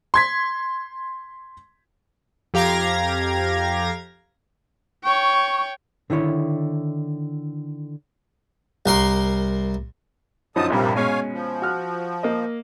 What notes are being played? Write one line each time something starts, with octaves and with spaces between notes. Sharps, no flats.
C6 G#6 B6
F2 G4 F5 A#5 G#6 A#6
C#5 G5 C#6
D3 D#3 E4 C#5
C2 A#4 C6
F#2 D3 F3 D#4 A5 D#6
A#1 G2 C3 G3 A#3
B2 G#3 C#4 C#5 F5 G#5
F3
F#4 F6 F#6
A#3 D#5